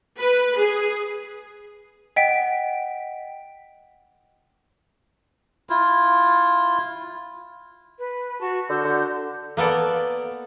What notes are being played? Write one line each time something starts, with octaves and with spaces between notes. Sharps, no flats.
B4
G#4
D#5 F#5 G5 B6 D7
E4 F4
B4
F#4 A5 C#6
D3 F#4 E6 G6
D3
A#3 B3 A4 D5